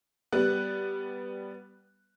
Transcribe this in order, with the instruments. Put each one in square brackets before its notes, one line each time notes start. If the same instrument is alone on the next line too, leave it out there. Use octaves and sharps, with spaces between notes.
[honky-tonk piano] G3 B3 F#6